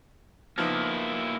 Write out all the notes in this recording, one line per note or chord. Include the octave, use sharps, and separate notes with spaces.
F3 A#3 B3 D#4 E4